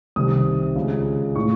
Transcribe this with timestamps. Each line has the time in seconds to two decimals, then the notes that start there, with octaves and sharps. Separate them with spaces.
0.16 C2 C3 D#3 D#6
0.75 C#2 C#3
1.36 A2 C#6